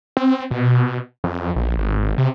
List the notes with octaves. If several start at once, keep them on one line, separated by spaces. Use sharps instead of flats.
C4
B2
F2
A#1
G#1
C3